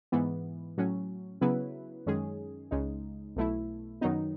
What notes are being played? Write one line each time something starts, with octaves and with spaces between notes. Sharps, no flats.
G#2 E3 B3
A2 F#3 C#4
C#3 F#3 B3 E4 B4
F#2 D#3 G#3 C#4 G#4
C#2 C#3 G#3 D#4
B1 B2 A3 E4
F#2 D#3 F#3 B3 D#4